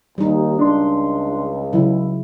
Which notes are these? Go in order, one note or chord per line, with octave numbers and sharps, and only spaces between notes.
D#2 G3 D#4
C#2 D4 C6
C#3 F#3 E4